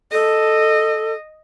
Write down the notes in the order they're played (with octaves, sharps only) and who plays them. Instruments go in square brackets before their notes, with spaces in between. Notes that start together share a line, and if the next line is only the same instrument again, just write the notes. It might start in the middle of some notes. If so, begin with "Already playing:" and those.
[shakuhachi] A4 [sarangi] D#5